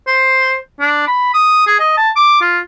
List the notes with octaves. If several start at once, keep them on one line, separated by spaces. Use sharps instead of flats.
C5
D4
B5
D#6
G#4
D#5
A5
D6
F4